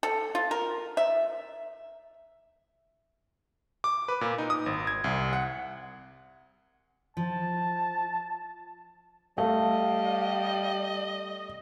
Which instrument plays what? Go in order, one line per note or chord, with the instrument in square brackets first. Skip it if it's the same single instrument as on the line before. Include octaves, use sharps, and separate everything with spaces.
[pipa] A4
F4
A#4
E5
[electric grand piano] D6
B4
A#2
D#4
D#6
G#1
G#6
C2
F#5
[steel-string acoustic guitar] F3 [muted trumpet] A5
[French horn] G3 [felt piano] A3 [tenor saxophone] D#5 [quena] F5